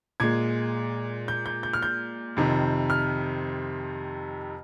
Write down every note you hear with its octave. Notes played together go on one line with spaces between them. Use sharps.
A#2 G#3 G#6
G6
G6
G6
F6
G6
F2 C3 D#3
F6